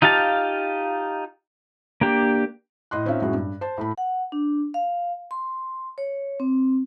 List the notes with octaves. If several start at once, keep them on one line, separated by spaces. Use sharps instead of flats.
D#4 F4 G4 F5 A5
A#3 D4 G4
A2 D#5 C6 F#6
C4 C#4 D#4 F4 E5 F5
F#2 A2 G#3 F#4 E5
G2
C5 A5
A2 A3 B5
F#5
D4
F5
C6
C#5
C4